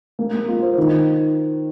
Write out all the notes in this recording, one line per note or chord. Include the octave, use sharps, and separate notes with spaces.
A#3
A#3
F4
C5
D#3